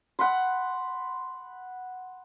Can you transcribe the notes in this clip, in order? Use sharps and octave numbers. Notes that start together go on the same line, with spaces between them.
F#5 B5 C6